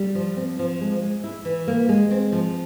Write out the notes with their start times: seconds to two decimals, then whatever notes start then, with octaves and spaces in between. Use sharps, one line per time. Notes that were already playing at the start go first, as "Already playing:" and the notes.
Already playing: G3
0.15 F3
0.37 C4
0.59 F3
0.81 G#3
1.02 G#3
1.24 E4
1.45 E3
1.67 A#3
1.89 G#3
2.11 C4
2.32 F3